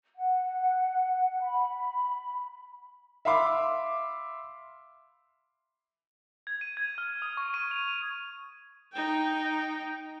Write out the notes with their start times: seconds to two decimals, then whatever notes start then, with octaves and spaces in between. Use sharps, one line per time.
0.16 F#5
1.42 B5
3.25 E5 F5 B5 C6 D6
6.47 G#6
6.61 D#7
6.77 G#6
6.98 F6
7.22 D#6
7.37 C#6
7.54 D#7
7.71 F7
8.93 D#4 G5